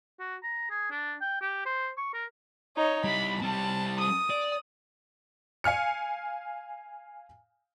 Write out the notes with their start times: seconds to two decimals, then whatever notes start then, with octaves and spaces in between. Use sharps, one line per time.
0.19 F#4
0.43 A#5
0.70 G#4
0.91 D4
1.21 G5
1.41 G4
1.65 C5
1.97 C#6
2.14 A#4
2.76 D#4 C#5
3.04 G3 E4 B5
3.42 G3 C4 A5
4.00 D#6
4.30 D5
5.64 F5 G#5 F6 C#7